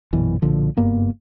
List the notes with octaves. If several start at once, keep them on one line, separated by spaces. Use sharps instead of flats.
A#1 F#2 B2 E3
B1 A#2 D3 F3
F#1 G2 A#3 B3